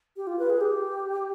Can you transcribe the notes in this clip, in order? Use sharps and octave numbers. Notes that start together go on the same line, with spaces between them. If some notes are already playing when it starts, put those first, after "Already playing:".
G4
F4
B4
G#4
G4